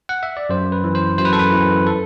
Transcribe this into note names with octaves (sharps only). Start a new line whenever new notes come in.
F#5
E5
D5
F#2 C5
B4
E3
C5
F#2 C5
B4
A4
B4
E3
A4